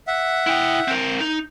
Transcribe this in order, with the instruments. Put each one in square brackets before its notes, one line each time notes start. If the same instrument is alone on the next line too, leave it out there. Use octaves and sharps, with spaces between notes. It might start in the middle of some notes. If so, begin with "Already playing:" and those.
[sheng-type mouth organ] E5 F#5
[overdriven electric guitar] E4 G5
C4 A#4
D#4